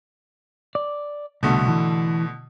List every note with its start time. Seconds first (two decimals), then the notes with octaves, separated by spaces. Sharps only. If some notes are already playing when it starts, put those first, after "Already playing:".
0.75 D5
1.43 C2 B2 D3 A3
1.68 E3